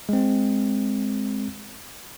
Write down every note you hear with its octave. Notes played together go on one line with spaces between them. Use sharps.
G#3 C4